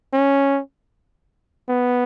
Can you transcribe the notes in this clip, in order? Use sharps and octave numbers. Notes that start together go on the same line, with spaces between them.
C#4
B3